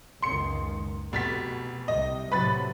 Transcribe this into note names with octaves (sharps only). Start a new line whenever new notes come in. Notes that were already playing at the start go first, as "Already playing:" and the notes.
F#1 C#2 D#3 C6 C#7
F1 B2 A6 B6
C2 C3 D#5
A2 C3 F#3 B4 B5 A6